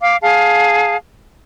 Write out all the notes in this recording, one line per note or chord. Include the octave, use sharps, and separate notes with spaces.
F5 D6
G#4 F5 A5